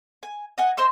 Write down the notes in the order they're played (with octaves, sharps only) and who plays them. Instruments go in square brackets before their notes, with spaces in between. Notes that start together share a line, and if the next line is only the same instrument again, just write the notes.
[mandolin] G#5
D#5 F#5 G#5
C5 D#5 C6 E6